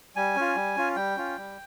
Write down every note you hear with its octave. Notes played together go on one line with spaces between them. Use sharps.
G3 G#5
C#4 F4
G3
C#4 F4
G3 G5
C#4 F4
G3